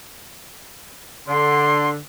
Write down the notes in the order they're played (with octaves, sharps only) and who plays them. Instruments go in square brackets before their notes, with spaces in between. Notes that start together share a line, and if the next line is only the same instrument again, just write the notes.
[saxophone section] D3 [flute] C6